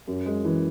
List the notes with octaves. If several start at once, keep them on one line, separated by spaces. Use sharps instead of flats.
F#2
G#3
E3